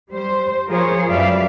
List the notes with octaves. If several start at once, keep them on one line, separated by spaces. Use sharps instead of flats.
G3 C5
F3 F4 G#4 A#4 C5 C#5
F#2 G3 B4 D5 E5 F5